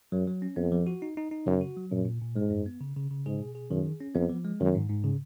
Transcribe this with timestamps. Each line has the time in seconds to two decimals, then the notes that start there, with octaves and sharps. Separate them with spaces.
0.12 F#2 F#3
0.27 F#3
0.42 C#4
0.56 F2 B3
0.72 F3
0.87 F#4
1.02 D#4
1.17 D#4
1.31 D#4
1.46 F#2 C#3
1.61 F#4
1.77 F#3
1.91 F#2 A#2
2.06 A#2
2.21 A#2
2.36 G#2 G#3
2.50 F#2
2.66 B3
2.81 C#3
2.96 C#3
3.11 C#3
3.26 G#2 G#4
3.40 B2
3.55 G#4
3.70 F#2 D#3
3.85 G#4
4.00 C#4
4.15 F2 B3
4.29 F3
4.45 G#3
4.61 F#2 D#3
4.75 G#2
4.90 G#2
5.04 C#3